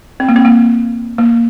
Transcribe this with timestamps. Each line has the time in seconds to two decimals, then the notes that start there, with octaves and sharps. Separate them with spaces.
0.20 C4
0.29 A#3
0.36 C4
0.45 A#3
1.18 A#3